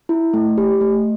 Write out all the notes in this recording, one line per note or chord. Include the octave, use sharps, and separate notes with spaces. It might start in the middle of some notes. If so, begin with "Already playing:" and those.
E4
A3
G4
A3